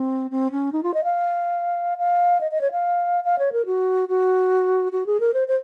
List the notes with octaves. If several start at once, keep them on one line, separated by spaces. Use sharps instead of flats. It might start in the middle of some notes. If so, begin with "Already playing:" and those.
Already playing: C4
C4
C#4
D#4
F4
D#5
F5
F5
D#5
D#5
C#5
F5
F5
C#5
A#4
F#4
F#4
F#4
G#4
A#4
C5
C5